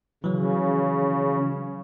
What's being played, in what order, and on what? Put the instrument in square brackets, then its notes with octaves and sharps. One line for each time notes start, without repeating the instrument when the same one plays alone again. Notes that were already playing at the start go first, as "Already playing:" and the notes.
[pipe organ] C#3 [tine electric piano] E3 F#3